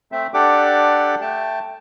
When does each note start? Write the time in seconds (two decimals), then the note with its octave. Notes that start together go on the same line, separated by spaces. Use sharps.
0.12 A3 C4 E5
0.34 D4 G4 A4 D5 F#5 D6
1.21 A3 G5 A5